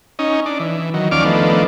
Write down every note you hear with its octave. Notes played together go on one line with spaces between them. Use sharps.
C#4 D#4
D4
E3
D#3 F#3
D#2 F3 C#4 D5 D6 F6
D#3 F3 A3 B3 D4